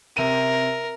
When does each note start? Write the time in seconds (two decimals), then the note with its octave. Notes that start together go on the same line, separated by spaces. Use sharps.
0.17 C3 A#4 D#7